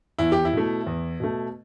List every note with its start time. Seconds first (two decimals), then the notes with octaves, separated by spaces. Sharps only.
0.19 E2 E4
0.32 G4
0.45 E4
0.53 B2 A3
0.86 E2
1.20 B2 A3